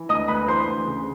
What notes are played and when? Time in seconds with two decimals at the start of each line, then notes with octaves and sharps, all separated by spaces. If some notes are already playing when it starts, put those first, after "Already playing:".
Already playing: E3
0.09 D2 D#5 D#6
0.28 D2 B4 B5
0.48 E3 C5 C6
0.68 D2
0.87 C#3